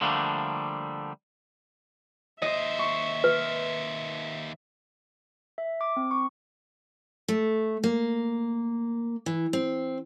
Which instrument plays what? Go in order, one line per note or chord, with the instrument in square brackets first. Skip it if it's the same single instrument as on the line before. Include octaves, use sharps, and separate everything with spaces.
[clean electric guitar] D3 F3 G3 A3 A#3 D4
[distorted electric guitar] D#2 C5 [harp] D#5 [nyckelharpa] E5
[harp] C#6
[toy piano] B4
[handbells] E5
D6
C4
C#6
[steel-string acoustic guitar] A3
A#3
E3
C4